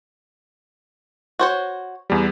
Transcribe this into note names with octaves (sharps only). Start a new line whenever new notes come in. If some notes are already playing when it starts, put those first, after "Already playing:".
F#4 C5 C#5
E2 G3